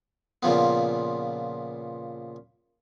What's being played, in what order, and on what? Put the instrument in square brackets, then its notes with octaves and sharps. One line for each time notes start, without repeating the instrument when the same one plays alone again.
[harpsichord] A#2 C#3 F3 B3